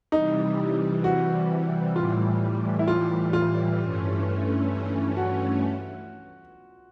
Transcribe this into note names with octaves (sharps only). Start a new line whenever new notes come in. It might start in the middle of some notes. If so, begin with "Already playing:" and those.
C3 E3 G3 D#4
F#4
A2 E3 G3 F4
E4
F4
F4
G2 E3 A3 C#4
F#4